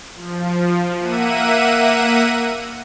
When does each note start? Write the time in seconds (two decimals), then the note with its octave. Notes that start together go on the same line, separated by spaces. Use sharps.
0.15 F3
0.99 A#3 E5 F#5 D#7